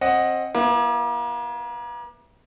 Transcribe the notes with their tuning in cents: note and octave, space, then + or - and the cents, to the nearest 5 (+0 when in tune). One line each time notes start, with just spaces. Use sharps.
C4 +30 D#5 +0 F#5 +0
A#3 +40 E4 +25 B4 +0